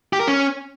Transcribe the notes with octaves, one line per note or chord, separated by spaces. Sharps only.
G4
A#4
C#4